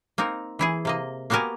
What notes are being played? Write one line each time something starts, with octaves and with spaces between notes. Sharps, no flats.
A#3 C4 D#4 A#4
E3 E4 G#4
C3 A#3 D#5
A#3 B3 F#4 G4 A#4 G#5